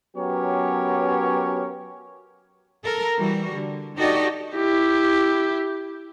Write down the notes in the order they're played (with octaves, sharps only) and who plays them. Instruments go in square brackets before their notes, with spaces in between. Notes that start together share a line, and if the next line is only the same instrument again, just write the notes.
[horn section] F#3 B3 C#4 G4 A#4 C#5
[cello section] A4 A#4
E3 G3 F#4
D3
D#4 F#4 G4 A4 D5 D#5
[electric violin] E4 G4